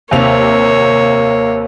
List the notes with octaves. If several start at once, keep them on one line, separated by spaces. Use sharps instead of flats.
D#2 C3 A#3 C#5 F7